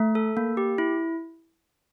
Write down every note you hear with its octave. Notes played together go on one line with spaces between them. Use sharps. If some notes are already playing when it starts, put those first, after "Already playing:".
Already playing: A3
A4
A#3
G4
E4